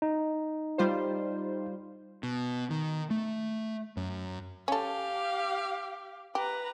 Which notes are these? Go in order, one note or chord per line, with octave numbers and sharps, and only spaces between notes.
D#4
G3 F4 C5
B2
D#3
A3
F#2
C#4 G4 A4 F5
G4 B4 A#5